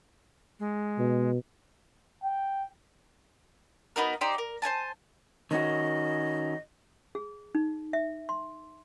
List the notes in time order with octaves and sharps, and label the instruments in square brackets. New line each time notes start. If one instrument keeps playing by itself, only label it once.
[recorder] G#3
[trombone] B2
[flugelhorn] G5
[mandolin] B3 D#4 F#4 A#4
D#4 G4 C5 D5
A#4
C5 C#5 G#5 A5
[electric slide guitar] D#3 C#4 F#4 [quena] D#5
[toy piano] G#4
D#4
E5
C6